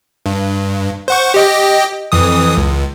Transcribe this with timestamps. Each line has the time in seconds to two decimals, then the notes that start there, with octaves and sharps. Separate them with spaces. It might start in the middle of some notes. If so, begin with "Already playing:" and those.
0.26 G2
1.08 C5 F#5 C#6
1.34 G4 D#5 G5
2.12 F2 E3 D#6
2.57 C#2